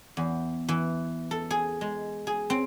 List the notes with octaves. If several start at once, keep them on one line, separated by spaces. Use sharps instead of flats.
E2
E3
A4
G#4
G#3
G#4
C4